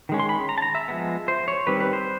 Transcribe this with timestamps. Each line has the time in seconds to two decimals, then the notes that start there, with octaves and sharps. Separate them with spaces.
0.09 D#3 G#3 C#4
0.20 C6
0.29 B5
0.49 A#5
0.58 A5
0.62 A#5
0.75 E5
0.88 F3 G#3 B3
1.28 C5
1.48 C#5
1.67 D#3 G3 C4 B4
1.80 B4
1.93 C5